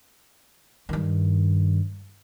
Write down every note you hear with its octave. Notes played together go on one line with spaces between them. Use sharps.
G2 D#3